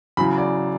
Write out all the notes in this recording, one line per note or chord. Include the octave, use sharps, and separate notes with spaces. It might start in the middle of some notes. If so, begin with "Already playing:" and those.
E2 C#3 F#3 B5
D5